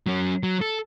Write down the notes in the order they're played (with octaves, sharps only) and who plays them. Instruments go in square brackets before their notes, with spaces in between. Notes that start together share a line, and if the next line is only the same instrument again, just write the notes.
[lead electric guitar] F#3 C#4
F#3
A4